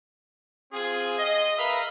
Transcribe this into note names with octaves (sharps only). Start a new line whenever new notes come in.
C4 F4 G#4
D#5
A#4 B4 E5 F5 B5